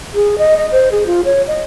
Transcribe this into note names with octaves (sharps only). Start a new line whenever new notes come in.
G#4
D#5
D#5
C5
G#4
F4
C#5
D#5